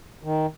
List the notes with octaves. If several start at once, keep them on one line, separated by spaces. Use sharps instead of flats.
D#3